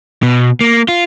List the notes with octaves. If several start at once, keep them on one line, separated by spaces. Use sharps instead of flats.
B2
A#3
F4